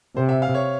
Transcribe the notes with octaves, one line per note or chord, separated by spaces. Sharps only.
C3 C5
E5
F5
C#5